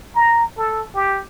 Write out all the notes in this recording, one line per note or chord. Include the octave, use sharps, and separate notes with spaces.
A#5
A4
G4